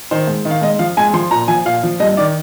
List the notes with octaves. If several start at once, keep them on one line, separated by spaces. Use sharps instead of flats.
D#3 C5
G#2
D#3
F5
G#2 D#5
F3 F5
G#2 G#5
F3 C6
A#2 A#5
F3 G#5
A#2 F5
F3
G2 D#5
D#3 D5